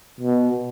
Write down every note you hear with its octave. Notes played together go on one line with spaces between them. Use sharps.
B2